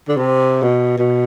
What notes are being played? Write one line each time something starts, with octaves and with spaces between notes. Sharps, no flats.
D3
C3
B2
B2